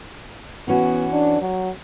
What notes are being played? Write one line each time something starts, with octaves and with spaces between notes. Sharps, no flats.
E3 B3 C#4 F#4
D4
F#3